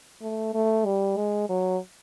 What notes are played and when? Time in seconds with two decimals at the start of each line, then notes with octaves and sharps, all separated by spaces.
0.22 A3
0.54 A3
0.86 G3
1.17 G#3
1.49 F#3